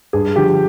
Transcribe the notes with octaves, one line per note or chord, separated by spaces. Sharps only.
G2 G#4
D3 F3 G4